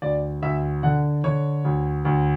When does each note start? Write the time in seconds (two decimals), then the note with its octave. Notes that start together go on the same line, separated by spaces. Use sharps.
0.02 D2 D5
0.42 D2 E5
0.83 D3 F#5
1.24 D3 C#5
1.65 D2
2.05 D2